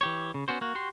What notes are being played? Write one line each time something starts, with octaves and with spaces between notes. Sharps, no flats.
E3 G4 C#5
C#3
B3 C#4 F#4 C5
A#3 F#4
F#4 G4 C6